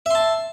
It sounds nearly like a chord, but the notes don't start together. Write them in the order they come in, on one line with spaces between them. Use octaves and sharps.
E5 C6 A5